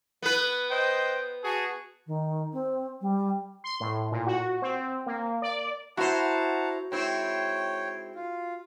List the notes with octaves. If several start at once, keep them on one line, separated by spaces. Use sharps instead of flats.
B3 B4
C5 D#5 G5
F#4 G#4 A5
D#3
C4
G3
C6
A2
A#2
F#4
C4
A#3
D5
E4 F#4 C5 F#5 A5 A#5
G#2 C4 E4 C#5 G5
F4